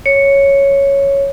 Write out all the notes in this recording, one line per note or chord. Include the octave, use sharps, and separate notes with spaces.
C#5